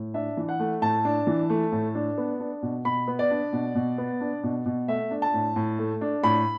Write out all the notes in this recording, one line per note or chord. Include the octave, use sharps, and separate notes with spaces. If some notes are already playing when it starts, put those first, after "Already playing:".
Already playing: A2
D4 E5
E3
F#5
A3
A2 A5
D4
E3
A3
A2
D4
B3
D4
B2
B2 B5
B3
D5
D4
B2
B2
B3
D4
B2
B2
A3 E5
D4
A5
A2
A2
A3
D4
A2 B5